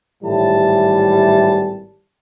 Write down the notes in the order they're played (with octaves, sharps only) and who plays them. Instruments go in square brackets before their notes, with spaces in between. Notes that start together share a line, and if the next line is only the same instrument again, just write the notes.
[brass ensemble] G#1 A2 E3 G3 A5